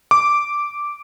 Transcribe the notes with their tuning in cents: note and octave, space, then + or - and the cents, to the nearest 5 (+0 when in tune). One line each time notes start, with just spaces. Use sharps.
D6 -5